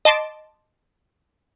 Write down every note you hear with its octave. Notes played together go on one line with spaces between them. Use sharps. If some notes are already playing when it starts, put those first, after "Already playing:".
D#5 A5 C6 D6